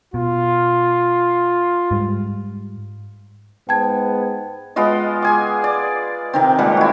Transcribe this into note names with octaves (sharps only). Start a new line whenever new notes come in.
B2 F4
G#2 G3
G#2 B3 G5 A5 G#6
G#3 B3 F4 D#5
G#4 G#5 D6
D5
C3 D#3 C4
A#2 G3 G#3 F#5
E4 F#4